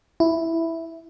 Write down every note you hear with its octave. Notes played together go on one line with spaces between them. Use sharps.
E4